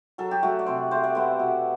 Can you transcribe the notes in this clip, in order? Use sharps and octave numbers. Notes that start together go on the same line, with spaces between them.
F#3 A4
G4
A3 F#4
D5
C3 C5
A3 C5
D5
B3 C5
B2